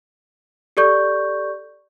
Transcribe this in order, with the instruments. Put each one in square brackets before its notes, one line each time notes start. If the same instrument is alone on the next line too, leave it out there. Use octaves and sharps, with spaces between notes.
[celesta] G4 A4 D5 C#6 G6